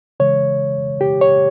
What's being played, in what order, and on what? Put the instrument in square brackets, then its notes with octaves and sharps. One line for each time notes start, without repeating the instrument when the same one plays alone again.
[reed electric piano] C#3 E3 G#3 C#5
G4
C#5